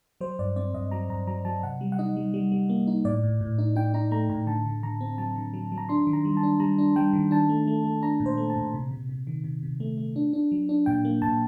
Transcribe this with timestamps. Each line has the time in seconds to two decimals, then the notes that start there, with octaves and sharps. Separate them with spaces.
0.21 F#3 C5
0.39 G2 D5
0.56 C4 D5
0.74 G2 D#5
0.91 F#3 A#5
1.10 G2 A#5
1.27 F#3 A#5
1.45 F#3 A5
1.63 C3 F#5
1.81 G3
1.92 F#5
1.99 D#4 D#5
2.16 G3
2.34 G3
2.52 G3
2.69 A#3
2.87 D#4
3.05 A2 D5
3.24 A2
3.41 A2
3.58 D#4
3.76 D#4 G5
3.94 D#4 A#5
4.11 A3 A#5
4.30 A2 A#5
4.47 D3 A5
4.66 D3
4.83 D3 A#5
5.01 C4
5.18 F#3 A5
5.36 D3
5.54 F#3
5.72 F#3
5.78 A#5
5.89 D4 C6
6.07 D#3
6.13 A#5
6.25 G3
6.37 A5
6.43 D4
6.60 G3 A#5
6.78 D4
6.96 G3 G5
7.13 D#3
7.31 D4 A5
7.49 A3
7.67 A3
7.84 A3
8.02 D4 A#5
8.20 A#2
8.26 C5
8.37 A3
8.50 A5
8.55 A#2
8.74 C3
8.91 C3
9.09 C3
9.27 D#3
9.44 C3
9.63 C3
9.80 A3
9.98 A3
10.16 D4
10.33 D4
10.52 F#3
10.69 D4
10.86 A#2 G5
11.05 A#3
11.22 A#2 A5